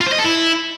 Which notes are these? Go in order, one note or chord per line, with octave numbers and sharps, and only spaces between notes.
F4
C5
D#5
A4
E4